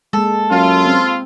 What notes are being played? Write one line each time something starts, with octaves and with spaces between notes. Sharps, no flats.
G#3 A#3 A4
F#2 F4
C4